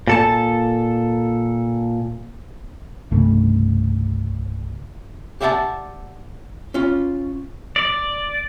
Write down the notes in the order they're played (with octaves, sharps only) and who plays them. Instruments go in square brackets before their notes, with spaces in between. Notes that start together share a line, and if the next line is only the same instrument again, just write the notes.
[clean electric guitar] A#2 A4 A5
[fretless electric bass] C2 G2 C#3 A3
[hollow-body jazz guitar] G4 D5 E5 F#5 G5 A5
C#4 F4
[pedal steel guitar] D5